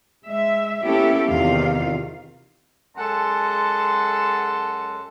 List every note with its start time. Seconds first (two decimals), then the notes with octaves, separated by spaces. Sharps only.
0.24 G#3 E5
0.84 A#3 B3 C#4 E4 G4 A4
1.28 E2 C3 D#3 F4 F5
2.97 F#2 G#3 A4 F#5 A5 C6